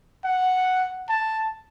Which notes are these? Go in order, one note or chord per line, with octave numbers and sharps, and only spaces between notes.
F#5
A5